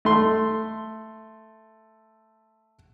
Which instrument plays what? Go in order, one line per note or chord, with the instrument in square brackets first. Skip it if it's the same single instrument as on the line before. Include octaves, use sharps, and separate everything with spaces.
[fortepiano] A3 C6